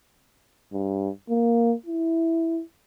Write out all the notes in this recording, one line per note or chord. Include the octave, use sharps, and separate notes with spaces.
G2
A#3
E4